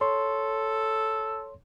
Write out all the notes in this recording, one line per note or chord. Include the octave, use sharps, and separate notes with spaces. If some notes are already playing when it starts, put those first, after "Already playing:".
A4 C#5 C6